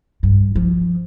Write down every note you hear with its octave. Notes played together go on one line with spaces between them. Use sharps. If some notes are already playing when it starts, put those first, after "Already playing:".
G2
F3